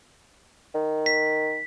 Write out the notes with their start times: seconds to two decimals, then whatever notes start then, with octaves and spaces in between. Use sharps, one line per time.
0.75 D#3
1.06 B6